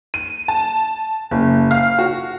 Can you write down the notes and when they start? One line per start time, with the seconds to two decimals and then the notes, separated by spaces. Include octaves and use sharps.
0.14 D#7
0.48 A5
1.31 F#1
1.71 F5
1.99 F#4